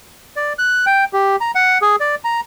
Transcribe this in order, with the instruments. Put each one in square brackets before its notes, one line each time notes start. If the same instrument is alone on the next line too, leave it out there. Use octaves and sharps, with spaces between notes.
[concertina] D5
F#6
G5
G4
A#5
F#5
G#4
D5
A#5